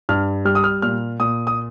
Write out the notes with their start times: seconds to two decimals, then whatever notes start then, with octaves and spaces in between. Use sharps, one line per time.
0.09 G2 F6
0.45 G3 F6
0.55 D#6
0.64 F6
0.82 A#2 F6
1.20 A#2 D#6
1.47 D#6